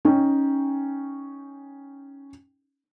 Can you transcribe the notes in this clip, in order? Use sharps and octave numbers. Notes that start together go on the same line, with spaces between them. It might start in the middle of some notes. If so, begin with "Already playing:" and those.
C#4 D#4 G5